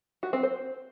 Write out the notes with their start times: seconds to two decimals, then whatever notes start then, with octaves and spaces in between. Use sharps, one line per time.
0.23 F#4
0.33 C4
0.43 C5